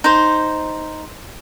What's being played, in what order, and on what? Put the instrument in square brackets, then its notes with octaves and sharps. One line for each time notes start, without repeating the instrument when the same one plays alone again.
[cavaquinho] D#4 C5